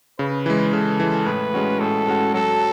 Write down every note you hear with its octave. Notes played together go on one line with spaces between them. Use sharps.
C#3 B4
E3 G#3
C#3 A4
E3 G#3
A2 B4
G#3 C#4 F#4
A2 A4
G#3 C#4 F#4
F#3 A4